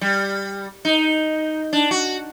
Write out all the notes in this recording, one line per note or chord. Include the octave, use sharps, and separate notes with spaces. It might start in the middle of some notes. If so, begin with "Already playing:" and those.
G3
D#4
D4
F#4